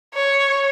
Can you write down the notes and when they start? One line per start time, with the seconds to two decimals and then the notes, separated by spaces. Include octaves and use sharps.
0.14 C#5